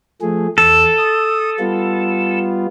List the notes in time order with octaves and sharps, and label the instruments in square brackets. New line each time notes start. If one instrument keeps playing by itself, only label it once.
[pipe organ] F3 A3 G#4
[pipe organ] E2 [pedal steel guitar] A4
[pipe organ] D#6
G3 B3 F4